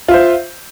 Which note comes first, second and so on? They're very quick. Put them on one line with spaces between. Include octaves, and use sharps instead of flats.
F4 E5 C5